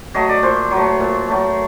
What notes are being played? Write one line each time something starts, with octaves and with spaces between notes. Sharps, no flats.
F#3 A3 D#5
D5
A#2 C5
F#3
A3
A#2
F#3 A3